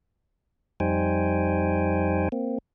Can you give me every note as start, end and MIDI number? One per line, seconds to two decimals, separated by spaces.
0.80 2.29 41
0.80 2.29 55
0.80 2.29 63
0.80 2.29 72
0.80 2.29 79
0.80 2.29 80
2.32 2.58 58
2.32 2.58 60